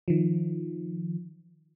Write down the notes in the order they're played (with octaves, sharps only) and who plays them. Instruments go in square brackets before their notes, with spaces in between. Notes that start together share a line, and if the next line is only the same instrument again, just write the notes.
[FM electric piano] D#3 F3